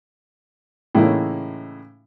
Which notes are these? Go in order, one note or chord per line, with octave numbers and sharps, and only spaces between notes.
A2 C#3 E3 A#3 D#4